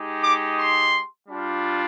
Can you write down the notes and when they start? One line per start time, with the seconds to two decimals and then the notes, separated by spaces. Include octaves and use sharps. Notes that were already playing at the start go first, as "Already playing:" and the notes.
Already playing: G#3 D#4 G4
0.22 D6
0.57 C6
1.29 G3 D4 F4